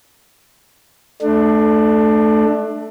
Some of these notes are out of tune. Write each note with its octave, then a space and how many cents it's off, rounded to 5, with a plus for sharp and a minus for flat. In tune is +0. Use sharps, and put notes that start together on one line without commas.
A3 -5 D4 +25